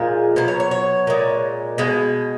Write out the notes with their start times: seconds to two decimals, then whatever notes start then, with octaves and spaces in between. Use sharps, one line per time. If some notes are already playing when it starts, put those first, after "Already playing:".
Already playing: A#2 F3 G#3 G#4
0.36 B2 F#3 B4
0.48 C#5
0.60 C#5
0.71 C#5
1.07 A#2 G#3
1.78 B2 G#3